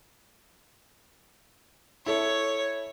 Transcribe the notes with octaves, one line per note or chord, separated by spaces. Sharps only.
E4 A4 C#5